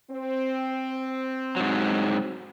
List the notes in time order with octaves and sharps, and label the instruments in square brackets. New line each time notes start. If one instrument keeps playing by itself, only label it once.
[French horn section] C4
[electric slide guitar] G#2 F#3